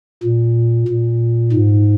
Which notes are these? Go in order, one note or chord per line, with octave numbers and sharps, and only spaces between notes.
A#2
A#2
G#2